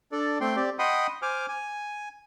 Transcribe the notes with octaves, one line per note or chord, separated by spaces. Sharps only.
D4 A4 D5
A3 C4 G5 C6
C4 G4 D5
D#5 F#5 G5 B5 C6 D#6
C5 G#5 D6 F6
G#5